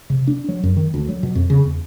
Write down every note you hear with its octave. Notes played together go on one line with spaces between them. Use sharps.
C3
D4
F#3
F#2
D#3
D2
F#3
B2
F2
C#3
E2